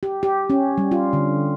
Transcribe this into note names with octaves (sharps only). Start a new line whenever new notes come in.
G4
G4
C#4
G3
F4
D3